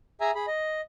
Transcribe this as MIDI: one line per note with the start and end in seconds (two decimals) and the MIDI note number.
0.21 0.31 68
0.21 0.31 76
0.21 0.31 80
0.21 0.31 82
0.35 0.46 68
0.35 0.46 83
0.47 0.81 75